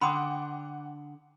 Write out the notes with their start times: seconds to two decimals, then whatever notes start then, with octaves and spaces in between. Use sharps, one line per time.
0.01 D3 F#5 G5 B5 C6 D6 D#6